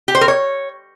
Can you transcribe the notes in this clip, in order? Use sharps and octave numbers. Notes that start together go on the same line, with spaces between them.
G4
C5
A#4
C#5